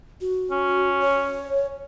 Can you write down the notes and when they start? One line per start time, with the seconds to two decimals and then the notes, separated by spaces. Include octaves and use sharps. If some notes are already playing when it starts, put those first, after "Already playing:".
0.21 F#4
0.51 C#4
1.01 C#5